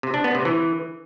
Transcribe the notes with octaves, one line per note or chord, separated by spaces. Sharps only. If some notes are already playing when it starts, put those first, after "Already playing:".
C3
D4
B3
C3
E3